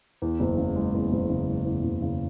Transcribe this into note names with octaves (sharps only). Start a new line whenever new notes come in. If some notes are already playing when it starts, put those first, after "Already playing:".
E2
F#1
C#3
G#3
E2
F#1
C#3
G#3
E2
F#1
C#3